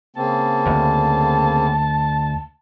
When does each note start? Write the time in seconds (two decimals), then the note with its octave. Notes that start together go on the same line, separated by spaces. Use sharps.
0.16 C#3 A#3 C4 A5
0.67 D2